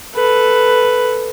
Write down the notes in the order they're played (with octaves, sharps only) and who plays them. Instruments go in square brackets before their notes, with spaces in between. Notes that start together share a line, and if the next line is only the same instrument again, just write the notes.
[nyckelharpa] A4 B4